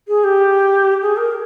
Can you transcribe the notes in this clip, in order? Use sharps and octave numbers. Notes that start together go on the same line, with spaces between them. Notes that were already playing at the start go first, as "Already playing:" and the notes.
G#4
G4
G#4
A#4